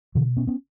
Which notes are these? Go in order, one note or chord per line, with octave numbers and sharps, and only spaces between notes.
B2 D3 E3
B3 C#4
B3 C#4